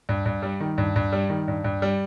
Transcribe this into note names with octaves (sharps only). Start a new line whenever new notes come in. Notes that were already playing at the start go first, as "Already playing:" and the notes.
G2
G2
G3
D#3
G2
G2
G3
D#3
G2
G2
G3